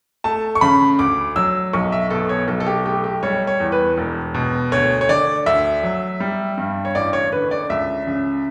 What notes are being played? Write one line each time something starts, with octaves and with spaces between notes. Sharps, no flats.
A3 A5
C#6
C#3 B5
D2 D6
F#3 E6
B1 C#6
E5
B2 A4
C#5
B1 A4
A4
G4
A3 G4
G4
G3 C#5
C#5
E2
B4
E1
B2
D2 C#5
C#5
D3 D5
D2 E5
F#3
G3
G2
C#5
A1 D5
C#5
D3 B4
D5
C#2 E5
C#3